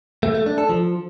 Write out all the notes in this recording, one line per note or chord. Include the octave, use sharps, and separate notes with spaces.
A3
A3
D4
A4
F3